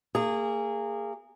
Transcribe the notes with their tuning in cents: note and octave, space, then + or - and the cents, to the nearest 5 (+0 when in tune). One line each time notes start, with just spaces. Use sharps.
A#3 -30 G#4 -20